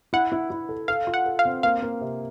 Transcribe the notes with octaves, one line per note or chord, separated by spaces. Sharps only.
E4 F#5
E4
E4
A4
A4 F5
F4
F#5
A4
F5
C4
A#3 F5
A#3
C3